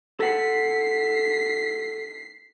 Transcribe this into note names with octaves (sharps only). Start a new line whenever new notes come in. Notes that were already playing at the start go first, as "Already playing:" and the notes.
A4 F#5 B6 C7